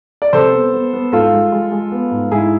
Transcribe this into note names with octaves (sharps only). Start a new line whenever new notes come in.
D5
C3 A4 C5
B3
B3
B3
G#2 F4 A4
G#3
G#3
G#3
B3
G#2
G#2 E4 G#4